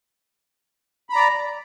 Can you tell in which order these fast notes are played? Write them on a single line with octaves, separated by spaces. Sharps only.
B5 A#5 D5